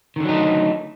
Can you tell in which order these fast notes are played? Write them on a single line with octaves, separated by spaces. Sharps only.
D#3 D3 F#3 D#4 A3